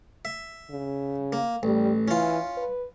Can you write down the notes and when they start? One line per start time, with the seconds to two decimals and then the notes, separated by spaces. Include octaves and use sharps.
0.25 E5
0.70 C#3
1.33 A#3
1.63 A1 G3
2.08 E3 C#4 F4
2.57 B4